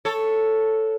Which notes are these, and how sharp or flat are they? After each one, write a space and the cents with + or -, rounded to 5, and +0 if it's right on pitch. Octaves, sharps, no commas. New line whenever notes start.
A4 +0 C#5 +0